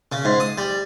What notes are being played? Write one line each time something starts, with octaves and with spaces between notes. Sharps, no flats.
C#3
G#2
D#6
G3